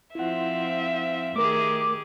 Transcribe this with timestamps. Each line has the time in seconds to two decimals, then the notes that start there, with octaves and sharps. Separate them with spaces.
0.15 F3 C4 E4 F4 E5 F#5
1.36 D#3 A3 G4 G#4 A#4 D6